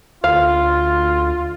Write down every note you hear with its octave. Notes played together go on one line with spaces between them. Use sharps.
D2 F4 F5